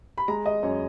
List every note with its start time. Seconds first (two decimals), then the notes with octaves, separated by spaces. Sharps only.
0.18 B5
0.28 G#3 A#5
0.46 D#5
0.63 F#2 C#5